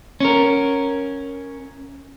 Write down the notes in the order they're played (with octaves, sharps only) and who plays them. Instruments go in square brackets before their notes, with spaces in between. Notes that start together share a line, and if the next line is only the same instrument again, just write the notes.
[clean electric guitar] C#4 A#4